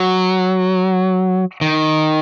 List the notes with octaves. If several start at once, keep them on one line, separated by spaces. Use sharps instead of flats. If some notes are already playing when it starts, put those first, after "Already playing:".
Already playing: F#3
D#3